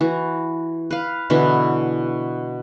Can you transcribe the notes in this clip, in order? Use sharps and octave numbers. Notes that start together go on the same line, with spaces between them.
E3 F#4
B4 F5
B2 D3 E3 E4